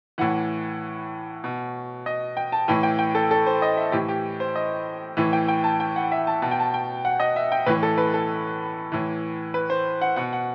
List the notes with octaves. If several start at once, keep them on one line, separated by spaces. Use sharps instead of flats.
A2 E3 F#5
B2
D#5
G5
A5
A2 E3 G5
G5
G5
A4
A4
C5
D#5
E5
A2 E3 G4
G4
C5
D#5
A2 E3
G5
G5
A5
G5
F#5
E5
A5
B2 A5
G5
A5
G5
F#5
D#5
E5
G5
A2 E3 B4
A4
B4
A4
A2 E3
B4
C5
F#5
B2 F#5
F#5